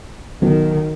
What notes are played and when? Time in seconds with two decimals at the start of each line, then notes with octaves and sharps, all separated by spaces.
0.42 B1 D#3